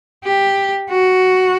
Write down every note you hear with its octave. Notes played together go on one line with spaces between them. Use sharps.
G4
F#4